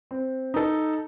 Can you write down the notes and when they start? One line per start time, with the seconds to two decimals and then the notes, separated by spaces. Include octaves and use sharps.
0.11 C4
0.54 D#4 A4